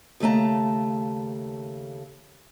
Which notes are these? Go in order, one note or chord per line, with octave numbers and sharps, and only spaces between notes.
D#2 C#3 A3 A5 A#5